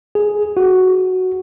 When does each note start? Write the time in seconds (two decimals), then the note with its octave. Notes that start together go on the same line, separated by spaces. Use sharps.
0.15 G#4
0.57 F#4